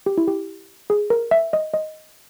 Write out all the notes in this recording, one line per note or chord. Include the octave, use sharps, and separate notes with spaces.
G4
E4
G4
G#4
A#4
E5
D#5
D#5